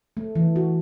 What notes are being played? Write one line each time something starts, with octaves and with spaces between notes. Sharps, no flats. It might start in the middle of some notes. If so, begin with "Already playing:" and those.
A3
E3
F#4